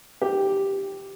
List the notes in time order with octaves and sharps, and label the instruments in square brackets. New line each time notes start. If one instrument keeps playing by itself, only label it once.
[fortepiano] G4